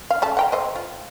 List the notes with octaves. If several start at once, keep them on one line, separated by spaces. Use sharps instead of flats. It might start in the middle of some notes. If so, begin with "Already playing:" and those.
F5
C#3 A3 A5
F#5 G5 A#5
A3 C5 D#5
F4